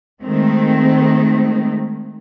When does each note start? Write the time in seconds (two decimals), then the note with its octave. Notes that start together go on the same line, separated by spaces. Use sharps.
0.23 D#3 G#3 A3 C4